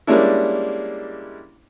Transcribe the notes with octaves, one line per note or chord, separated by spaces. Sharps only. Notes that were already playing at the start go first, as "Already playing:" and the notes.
G3 G#3 A#3 C#4 D4 E4